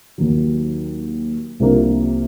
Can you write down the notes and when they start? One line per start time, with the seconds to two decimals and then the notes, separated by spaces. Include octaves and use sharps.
0.18 D#2 D#3 F#3
1.60 C2 C3 F3 A#3 D4